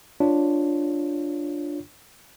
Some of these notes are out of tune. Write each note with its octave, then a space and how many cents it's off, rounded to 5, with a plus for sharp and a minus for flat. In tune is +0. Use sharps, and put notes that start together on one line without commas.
D4 +0 F4 +0 C#5 +0